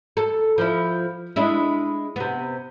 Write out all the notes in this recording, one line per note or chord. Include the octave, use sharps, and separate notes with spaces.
A4
F3 E4
G#3 D4 E4
C3 B3